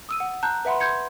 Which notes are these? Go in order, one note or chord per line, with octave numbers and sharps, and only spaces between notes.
D#6 E6 D#7
F#5
A5 A#5 F#6 G6
B4 E5 F#5 B5 C6
C6 G6 G#6 C#7